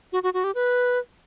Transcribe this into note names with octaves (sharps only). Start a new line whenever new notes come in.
F#4
F#4
F#4
G4
B4